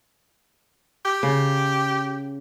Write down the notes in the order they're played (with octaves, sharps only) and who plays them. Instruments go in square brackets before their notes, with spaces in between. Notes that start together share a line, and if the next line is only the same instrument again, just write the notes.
[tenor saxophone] G4
[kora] C#3